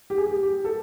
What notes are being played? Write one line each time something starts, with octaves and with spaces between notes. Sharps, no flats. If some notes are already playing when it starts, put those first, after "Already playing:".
G4
G#4
G4
G4
A4